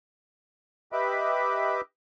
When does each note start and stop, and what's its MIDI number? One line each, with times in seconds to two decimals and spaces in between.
0.92 1.81 67
0.92 1.81 71
0.92 1.81 75
0.92 1.81 76
0.92 1.81 83
0.92 1.81 86